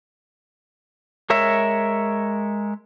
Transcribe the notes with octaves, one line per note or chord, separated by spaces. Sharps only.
G#3 A#4 C#5 E5